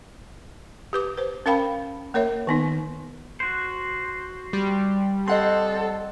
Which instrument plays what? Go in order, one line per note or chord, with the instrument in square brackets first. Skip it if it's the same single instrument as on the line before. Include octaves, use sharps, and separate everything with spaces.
[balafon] G4 B4 D6
B4 C5
C#4 A#4 F5 G5 B5
A#3 A#4 C#5 E5
D#3 B3 D#4
[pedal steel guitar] F#4 C5
[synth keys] G3
[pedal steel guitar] C4 [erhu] A4 [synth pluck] D#5 F#5 C6